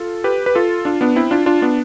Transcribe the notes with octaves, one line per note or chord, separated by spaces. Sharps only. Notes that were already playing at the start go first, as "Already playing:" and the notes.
Already playing: F4 A4
G4 B4
B4
F4 A4
D4 F4
B3 D4
C4 E4
D4 F4
D4 F4
B3 D4